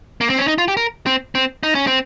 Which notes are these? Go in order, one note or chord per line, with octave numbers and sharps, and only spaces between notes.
A#3
C4
C#4
D#4
F4
G4
A#4
C4
C4
D#4
C#4
C4